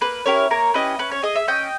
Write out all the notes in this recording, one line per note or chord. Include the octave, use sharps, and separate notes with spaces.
A#3 B4
C#4 E4 G4 A#4 C#5
A#3 A#4 C#5
C#4 E4 G4 B4 D#5
C#4 B4
C#5
G#4 D#5
E5
C#4 D#5 G5